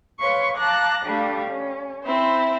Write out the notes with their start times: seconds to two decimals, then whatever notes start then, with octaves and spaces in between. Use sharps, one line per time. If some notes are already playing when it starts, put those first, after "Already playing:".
0.20 B4 C#5 F5 C6 C#6
0.57 F5 A5 A#5 D6 F#6 A#6
1.05 G3 A3 D4 G4 F5
1.49 C#4
2.04 C4 E4 C5